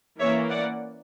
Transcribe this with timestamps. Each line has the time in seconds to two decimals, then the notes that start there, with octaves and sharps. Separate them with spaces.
0.19 E3 A#3 C#4 C#5 E5
0.49 D5 F#5